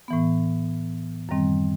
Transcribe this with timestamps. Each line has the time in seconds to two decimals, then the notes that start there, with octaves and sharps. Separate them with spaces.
0.08 A2 E3 B3
1.29 F#2 D#3 G3 C4